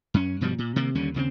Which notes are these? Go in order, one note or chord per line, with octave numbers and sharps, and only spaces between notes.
F#2 C#4
G2 B2 F3 G3
A#2
C3 D#3 A#3
D#2 D3 G3 C#4
D#2 C#3 B3 C4